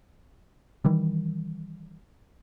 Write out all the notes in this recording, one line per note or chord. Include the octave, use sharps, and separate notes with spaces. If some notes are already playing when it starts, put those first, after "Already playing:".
D#3 E3 G3